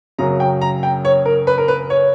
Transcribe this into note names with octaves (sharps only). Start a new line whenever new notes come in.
F#2 C#3 F#3 A#5
G5
A#5
G5
C#5
A#4
B4
A#4
B4
C#5